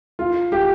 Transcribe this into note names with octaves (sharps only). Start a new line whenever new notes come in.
F4
G4